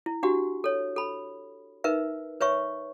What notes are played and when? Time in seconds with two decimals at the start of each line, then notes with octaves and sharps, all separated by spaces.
0.06 E4
0.23 D4 F#4 G4 F#5
0.64 A4 C#5
0.96 A4 B5
1.84 D#4 A#4 B4 E5
2.41 B4 C#5 E5 C#6